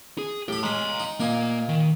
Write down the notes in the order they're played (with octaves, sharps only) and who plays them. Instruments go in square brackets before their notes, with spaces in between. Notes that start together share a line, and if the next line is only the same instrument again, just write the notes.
[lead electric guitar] G#4
[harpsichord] A2 B5 [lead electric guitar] G4
[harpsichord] G#3 C#4 [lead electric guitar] A#5 C6
[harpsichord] D#4
[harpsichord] A#2 D#4 G#5 [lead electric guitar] A#3
[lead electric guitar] D#3